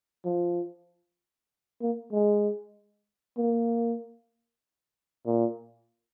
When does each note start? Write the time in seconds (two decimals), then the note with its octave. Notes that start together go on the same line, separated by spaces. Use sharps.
0.25 F3
1.81 A#3
2.12 G#3
3.38 A#3
5.26 A#2